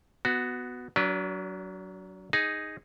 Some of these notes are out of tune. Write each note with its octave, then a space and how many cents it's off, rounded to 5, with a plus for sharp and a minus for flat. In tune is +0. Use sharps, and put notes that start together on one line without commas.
B3 +10 F#4 -5
F#3 +15 D4 -40 B4 -30
D#4 +0 G#4 -10